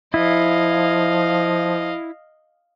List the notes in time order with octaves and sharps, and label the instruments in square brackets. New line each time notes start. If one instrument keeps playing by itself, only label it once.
[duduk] F3 [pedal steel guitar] E4 [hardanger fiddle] D#5 F5